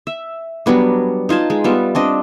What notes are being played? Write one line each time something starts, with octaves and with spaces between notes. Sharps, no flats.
E5
F#3 G3 B3 D4
D#4 F4 G#5 A5
G#3
G3 B3 F4 E5
C4 D4 D#5